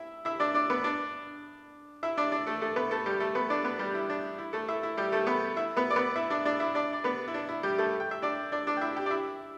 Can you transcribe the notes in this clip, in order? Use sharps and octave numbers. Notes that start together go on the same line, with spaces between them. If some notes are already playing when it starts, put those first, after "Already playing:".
Already playing: E4 E5
E4 E5
D4 D5
D4 D5
B3 B4
D4 D5
E4 E5
D4 D5
D4 D5
A3 A4
A3 A4
B3 B4
A3 A4
G3 G4
A3 A4
B3 B4
D4 D5
B3 B4
G3 G4
E4
D4
E4
A3 A4
E4 E5
E4
G3 G4
A3 A4
B3 B4
E4 E5
B3 B4
D5
B3 B4
E4 E5
D4 D5
D4 D5
E4 E5
D4 D5
D5
B3 B4
E4
D4
E4
G3 G4
A3 A4
G5
E5
D4 D5
D4 D5
D4 D5
G5
E4 E5
G4 G5
D5
E4 E5